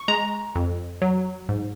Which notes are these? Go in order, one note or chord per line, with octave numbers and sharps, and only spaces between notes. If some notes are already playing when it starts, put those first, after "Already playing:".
Already playing: C#6
G#3 A#5
F2
F#3
G#2